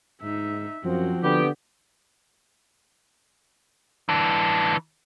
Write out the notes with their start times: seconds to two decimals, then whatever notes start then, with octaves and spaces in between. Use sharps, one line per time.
0.22 G#2 D#4 E5
0.84 F#2 F3 C4 F#4
1.23 D3 B3 G4
4.09 E3 D4